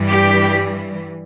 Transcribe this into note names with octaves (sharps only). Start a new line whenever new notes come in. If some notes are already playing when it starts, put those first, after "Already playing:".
Already playing: G2 E3 G3
G4